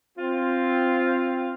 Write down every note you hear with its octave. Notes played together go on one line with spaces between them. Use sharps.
C4 F4